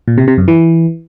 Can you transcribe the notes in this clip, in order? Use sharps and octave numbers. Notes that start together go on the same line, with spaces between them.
A#2
C3
C3
F#2
E3